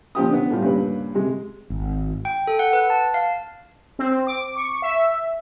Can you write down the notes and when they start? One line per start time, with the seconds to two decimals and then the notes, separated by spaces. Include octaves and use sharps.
0.15 A#2 F3 G4 D#6
0.30 B3 D4
0.50 A2 G3 F4
0.62 G2 A#2 C#3 B4
1.15 C3 G#3
1.70 G#1
2.25 G5
2.47 A4
2.59 F#5
2.73 B4
2.90 A5
3.14 F5
3.99 C4
4.27 D6
4.56 C#6
4.82 E5